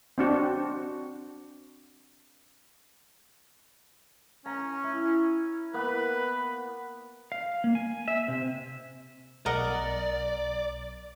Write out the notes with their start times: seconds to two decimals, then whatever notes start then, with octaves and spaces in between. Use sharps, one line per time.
0.18 C4 D4 F#4
4.46 C#4 A#5
4.84 E4
5.74 A#3 B3 B4
7.32 F5
7.64 A#3
7.75 G#5
8.08 E5
8.28 C3
9.46 B1 A#4 D5 D#5 F#5